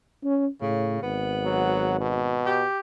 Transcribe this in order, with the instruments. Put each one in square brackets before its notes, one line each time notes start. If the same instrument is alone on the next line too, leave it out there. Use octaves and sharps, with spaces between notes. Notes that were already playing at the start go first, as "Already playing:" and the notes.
[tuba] C#4
[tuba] A2 [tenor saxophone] C#3
[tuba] G#1 [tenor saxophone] B3
[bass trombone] F#3
B2
[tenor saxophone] G4